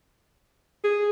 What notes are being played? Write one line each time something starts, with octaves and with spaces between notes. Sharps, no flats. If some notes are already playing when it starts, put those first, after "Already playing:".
G#4